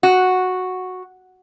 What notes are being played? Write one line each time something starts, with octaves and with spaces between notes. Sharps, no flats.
F#4